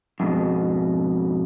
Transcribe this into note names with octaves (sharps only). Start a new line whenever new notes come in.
F2 G#2 B2